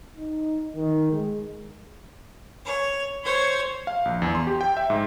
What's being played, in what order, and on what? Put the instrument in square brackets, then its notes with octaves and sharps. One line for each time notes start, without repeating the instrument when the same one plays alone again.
[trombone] D#4
D#3
G#3
[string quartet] C#5
C5 C#5 G#6
[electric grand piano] F5
A#1
E2
C6
G4
G5
E5
G#2